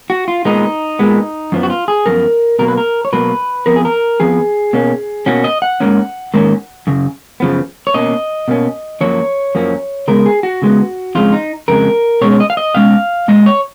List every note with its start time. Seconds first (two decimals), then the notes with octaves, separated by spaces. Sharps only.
0.10 F#4
0.28 F4
0.45 A#2 G#3 B3 D#4
0.99 A#2 G#3 B3
1.52 F#2 F3 B3
1.63 F#4
1.70 F4
1.88 G#4
2.06 F#2 F3 B3 A#4
2.59 B2 F#3 A#3 A#4
2.68 B4
2.77 A#4
3.05 C#5
3.13 B2 F#3 A#3 B4
3.66 F2 F3 B3 A#4
3.76 G#4
3.85 A#4
4.20 F2 F3 B3 G#4
4.73 B2 A#3 C#4
5.26 B2 A#3 C#4 F#4
5.44 D#5
5.62 F#5
5.80 G#2 D#3 A#3 C#4
6.34 G#2 D#3 A#3 C#4
6.87 F#2 C#3
7.40 F#2 C#3 F3 B3
7.87 C#5
7.94 B2 A#3 C#4 D#5
8.48 B2 A#3 C#4
9.01 F#2 F3 A#3 C#5
9.55 F#2 F3 A#3 C#4
10.08 C#3 G#3 B3 A#4
10.26 G#4
10.43 F#4
10.62 C#3 G#3 B3
11.15 F2 C#3 G#3 F4
11.33 D#4
11.68 F2 C#3 G#3 A#4
12.21 B2 G#3 C#4 C#5
12.32 C#5
12.40 D#5
12.50 F5
12.57 D#5
12.75 B2 G#3 C#4 F5
13.28 A#2 G#3 D#5
13.46 C#5